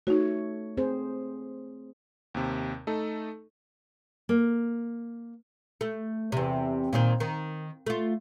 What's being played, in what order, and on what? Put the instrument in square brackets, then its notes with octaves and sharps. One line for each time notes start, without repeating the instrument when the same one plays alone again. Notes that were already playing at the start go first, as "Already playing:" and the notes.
[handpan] A3 C#5 [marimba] D#4 F#4
[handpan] C4 G#4 C5
[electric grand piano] D#2 C3
A3 D#4 A4
[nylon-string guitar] A#3
[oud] A3
E2 C3
A#2 D#3 C4
D#3
A3 F4